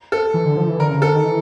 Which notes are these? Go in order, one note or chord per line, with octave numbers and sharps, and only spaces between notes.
A4
E3
D3
F3
E3
D3 A#4
C#3
D3 A4
D#3
E3